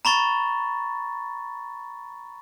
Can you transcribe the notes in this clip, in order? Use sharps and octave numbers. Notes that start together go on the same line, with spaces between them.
A#5 B5 C#6 A6